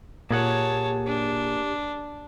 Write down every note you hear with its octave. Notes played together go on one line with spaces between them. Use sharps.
A#2 A#3 G4 G#4 C#5 F#5 A5
D4